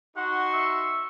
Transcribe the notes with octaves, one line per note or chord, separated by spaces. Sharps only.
D#4 F#4 F#5 C6 C#6
E5